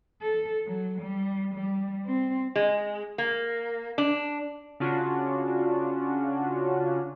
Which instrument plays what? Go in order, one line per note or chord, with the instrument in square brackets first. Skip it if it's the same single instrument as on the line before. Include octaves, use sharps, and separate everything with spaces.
[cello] A4
F#3
G3
G3
C4
[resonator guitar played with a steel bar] G#3
A#3
D4
[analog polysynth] C#3 C#4 D4 F4 F#4